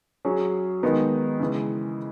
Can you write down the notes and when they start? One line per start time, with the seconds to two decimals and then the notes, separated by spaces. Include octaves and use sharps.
0.25 F#3 C#4 G#4
0.83 D#3 G#3 B3 D#4
1.40 C#3 E3 G#3